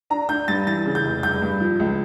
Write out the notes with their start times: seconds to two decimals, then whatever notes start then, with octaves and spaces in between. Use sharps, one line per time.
0.10 D4 A#5
0.29 D4 G6
0.48 G2 A6
0.67 E3 A6
0.86 C#3
0.95 G6
1.04 F1
1.23 G2 G6
1.42 G2
1.61 F3
1.80 C#2